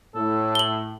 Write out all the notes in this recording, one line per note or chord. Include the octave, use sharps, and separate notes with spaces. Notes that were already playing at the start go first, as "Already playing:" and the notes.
A2 A4
F#7 G7